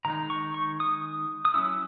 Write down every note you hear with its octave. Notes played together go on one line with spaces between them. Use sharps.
D#3 G#3 D#4 A#5
C#6
C#6
D#6
D#6
F#3 C#4 E4 E6